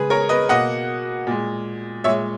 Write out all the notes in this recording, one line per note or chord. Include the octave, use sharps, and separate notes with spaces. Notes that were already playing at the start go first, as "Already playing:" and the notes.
Already playing: C#3 G#3 G#4 B4
A#4 C#5
B4 D#5
B2 A#3 D#5 F#5
A#2 G#3
A#2 G#3 C#5 E5